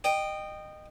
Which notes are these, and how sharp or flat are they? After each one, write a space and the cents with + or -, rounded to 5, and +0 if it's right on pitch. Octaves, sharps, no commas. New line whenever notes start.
D#5 -20 G5 +0